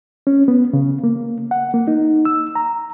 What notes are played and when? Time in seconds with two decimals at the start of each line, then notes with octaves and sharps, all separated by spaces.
0.27 C#4
0.48 B3
0.73 C#3
1.04 A#3
1.51 F#5
1.74 A#3
1.88 D#4
2.25 E6
2.55 A#5